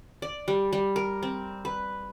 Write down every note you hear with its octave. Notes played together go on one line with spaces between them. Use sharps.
D5
G3
G3
A#4
C4
B4